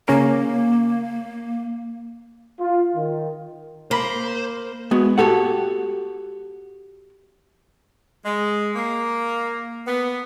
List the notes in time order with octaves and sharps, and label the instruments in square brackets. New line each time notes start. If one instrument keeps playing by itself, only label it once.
[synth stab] C#3 C#4 A#4 [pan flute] A#3
[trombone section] F4
D#3
[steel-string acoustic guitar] A#3 [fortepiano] A#4 B5 [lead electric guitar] C5
[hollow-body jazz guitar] G#3 B3 F#4
F#4 G4 A4 F#5
[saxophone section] G#3
A#3
B3